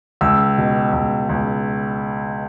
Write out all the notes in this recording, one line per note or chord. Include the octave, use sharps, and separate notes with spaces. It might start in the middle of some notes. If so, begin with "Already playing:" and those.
C#2 E6
B2
C#2
C#2